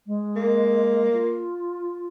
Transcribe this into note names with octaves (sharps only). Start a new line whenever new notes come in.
G#3
A#3
F4